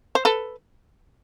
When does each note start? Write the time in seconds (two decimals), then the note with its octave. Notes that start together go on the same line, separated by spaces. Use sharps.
0.15 C5
0.25 A4 B4